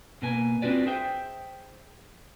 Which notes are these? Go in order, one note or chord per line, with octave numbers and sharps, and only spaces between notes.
B2 A#3 B4 G#5
C4 D4 F4 F#4 B4 D5
G#4 C5 E5 G5